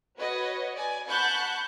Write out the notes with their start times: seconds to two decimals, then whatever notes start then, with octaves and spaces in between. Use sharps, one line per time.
0.17 F#4 B4 C#5 D#5
0.74 D5 G#5
1.08 F#5 A5 B5 C#6 F#6 G6